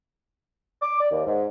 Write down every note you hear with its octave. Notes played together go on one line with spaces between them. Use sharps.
D6
D5
D#2
G#2